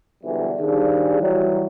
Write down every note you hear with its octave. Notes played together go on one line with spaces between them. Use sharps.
B1 E2 G#2 D3 E3 G3
D#3 F3 G3 D4 G#4
E3 F#3 G3